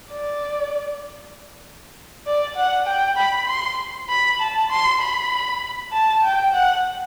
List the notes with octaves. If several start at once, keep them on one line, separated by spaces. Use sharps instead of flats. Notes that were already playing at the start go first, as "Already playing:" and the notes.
D5
D5
F#5
G5
B5
C6
B5
A5
C6
B5
A5
G5
F#5